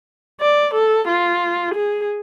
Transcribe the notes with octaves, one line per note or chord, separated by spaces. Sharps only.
D5
A4
F4
G#4